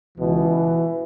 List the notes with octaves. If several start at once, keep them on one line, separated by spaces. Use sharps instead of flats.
C#2 B2 E3